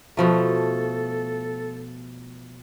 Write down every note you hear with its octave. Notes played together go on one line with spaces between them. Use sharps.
B2 F3 A3 A4